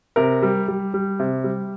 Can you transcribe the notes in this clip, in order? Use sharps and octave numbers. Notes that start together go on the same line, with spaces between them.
C3 A#4
G3
G3
G3
C3
G3